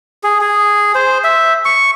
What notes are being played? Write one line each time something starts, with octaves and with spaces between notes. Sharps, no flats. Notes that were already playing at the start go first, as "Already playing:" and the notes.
G#4
G#4
C5
E5
C#6